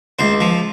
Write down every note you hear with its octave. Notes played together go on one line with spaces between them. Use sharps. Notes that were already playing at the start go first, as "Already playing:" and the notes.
C#2 C5
F3